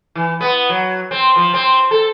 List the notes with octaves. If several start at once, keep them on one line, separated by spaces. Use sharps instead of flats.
E3
B3
F#3
C4
F3
C4
A4